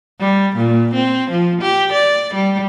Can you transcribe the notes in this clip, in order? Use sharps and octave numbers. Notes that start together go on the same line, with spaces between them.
G3
A#2
C4
F3
G4
D5
G3